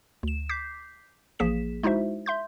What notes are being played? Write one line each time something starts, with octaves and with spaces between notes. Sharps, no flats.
D2 E7
D6 G6 B6 C7
A1 F3 A#3 G#4 B6 E7
G#3 D#4 E4 F#4 C5 E5
E5 C6 G6